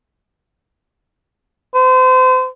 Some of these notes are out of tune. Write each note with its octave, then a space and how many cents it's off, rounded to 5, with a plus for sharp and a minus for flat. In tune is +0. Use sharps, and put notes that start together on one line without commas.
C5 -35